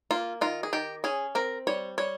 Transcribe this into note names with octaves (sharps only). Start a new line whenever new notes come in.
A#3 F4
D#3 F4
G#4
D#3 G4
C#4 G#4
C4 A#4
G3 C#5
G3 C#5